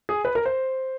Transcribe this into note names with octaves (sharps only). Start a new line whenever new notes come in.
G#4
B4
A#4
C5